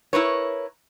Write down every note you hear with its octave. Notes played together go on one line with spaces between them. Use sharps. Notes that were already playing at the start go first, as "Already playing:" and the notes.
E4 A#4 B4 C#5